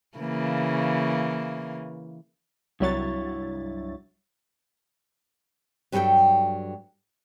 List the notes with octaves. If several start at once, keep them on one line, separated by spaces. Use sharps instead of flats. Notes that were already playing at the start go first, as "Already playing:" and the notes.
C#3 E3 A#3
C2 G2 F#3 E4 C#5 A6
G2 F#3 G3 G#4 A4 G5